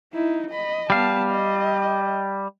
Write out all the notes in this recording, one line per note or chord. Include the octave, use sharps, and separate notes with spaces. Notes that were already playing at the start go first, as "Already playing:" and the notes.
D#4 E4
D#5 B5
G3 B3 F5 A5
D#5